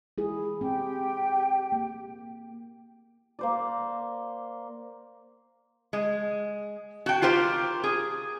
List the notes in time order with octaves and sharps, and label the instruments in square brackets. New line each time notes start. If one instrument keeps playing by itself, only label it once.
[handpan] E4 G#4
[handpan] C4 [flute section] G4 G5
[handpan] A#3
[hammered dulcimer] A#3 C5 D5
[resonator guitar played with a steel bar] G#3
F#4 G5
F4 G4 A#4 C5
G#4